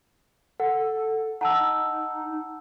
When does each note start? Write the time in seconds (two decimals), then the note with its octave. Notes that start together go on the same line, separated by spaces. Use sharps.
0.60 A4 F#5
1.41 D#4 F#5 A5 E6